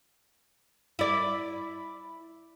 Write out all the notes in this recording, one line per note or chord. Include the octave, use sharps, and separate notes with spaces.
E4 D5